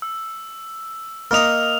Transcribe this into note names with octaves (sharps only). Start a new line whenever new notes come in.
E6
A#3 D#4 D#5 F6 F7